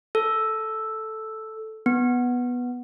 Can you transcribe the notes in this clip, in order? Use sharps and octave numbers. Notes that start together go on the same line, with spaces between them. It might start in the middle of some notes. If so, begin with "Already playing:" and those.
A4
B3